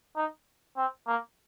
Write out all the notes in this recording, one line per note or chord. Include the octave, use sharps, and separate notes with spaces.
D#4
C4
A#3